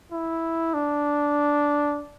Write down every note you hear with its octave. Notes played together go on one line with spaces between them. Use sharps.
E4
D4